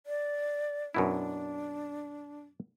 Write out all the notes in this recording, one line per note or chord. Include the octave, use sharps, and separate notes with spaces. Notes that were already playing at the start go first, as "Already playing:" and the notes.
D5
F#2 B2 D4 E4